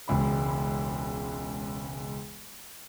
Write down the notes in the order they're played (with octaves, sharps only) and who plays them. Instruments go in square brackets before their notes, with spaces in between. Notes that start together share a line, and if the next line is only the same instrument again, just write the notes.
[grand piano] E1 C#2 B5